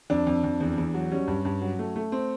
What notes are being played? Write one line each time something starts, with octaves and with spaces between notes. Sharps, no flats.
F2 D4
F2
F2
E2
E2
F#3
G3 C#4
G2
G2
F#3
A3
A3
C4